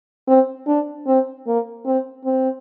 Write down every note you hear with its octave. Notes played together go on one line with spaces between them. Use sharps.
C4
D4
C4
A#3
C4
C4